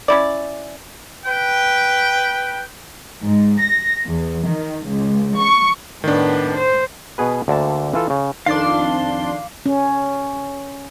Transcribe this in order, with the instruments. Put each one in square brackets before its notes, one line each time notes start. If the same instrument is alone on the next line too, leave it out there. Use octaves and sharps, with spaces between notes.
[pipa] C#4 E4 D5
[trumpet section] B4 G5
[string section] G#2
A#6
E2
D#3
C#2
C#6
[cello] A2 B3 [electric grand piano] D#3 D4
[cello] C5
[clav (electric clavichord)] B2 B3 G#4 B4
D2 D3 A#3 A5
E3 F4 A4
C#3
[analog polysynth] F2 D4 C6 [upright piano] D#3 [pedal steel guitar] F5 D6
[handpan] C#4